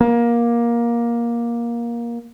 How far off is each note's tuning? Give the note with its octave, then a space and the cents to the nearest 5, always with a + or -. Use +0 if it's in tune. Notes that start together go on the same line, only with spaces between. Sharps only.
A#3 +15